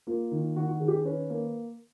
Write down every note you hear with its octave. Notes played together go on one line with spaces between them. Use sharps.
A#3 F4
D#3
D#3 F#4
F#4
D#3 G#4
G4
G#4
C#4 B4
A#3